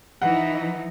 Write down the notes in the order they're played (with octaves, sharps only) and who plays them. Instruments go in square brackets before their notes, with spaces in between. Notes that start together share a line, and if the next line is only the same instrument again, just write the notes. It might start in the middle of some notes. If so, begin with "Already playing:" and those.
[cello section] E3 F3 D#4 [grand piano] F#5